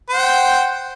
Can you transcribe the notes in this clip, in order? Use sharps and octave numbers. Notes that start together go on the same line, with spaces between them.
C5 F#5 G5